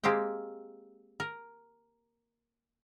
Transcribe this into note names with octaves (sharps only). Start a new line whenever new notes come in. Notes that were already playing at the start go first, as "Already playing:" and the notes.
G#3 A#3 C4 G4 G5
A#4